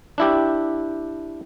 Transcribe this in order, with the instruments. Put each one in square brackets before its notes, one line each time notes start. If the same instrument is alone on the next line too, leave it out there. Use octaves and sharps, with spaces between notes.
[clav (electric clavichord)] D4 E4 G4